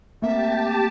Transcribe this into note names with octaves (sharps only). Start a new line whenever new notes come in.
A3 A#3 C4 G4 E5 A5